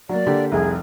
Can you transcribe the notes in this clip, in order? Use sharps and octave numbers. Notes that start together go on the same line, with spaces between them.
F#3 A#3 D5
D3 A#3 G4
F1 C2 G#4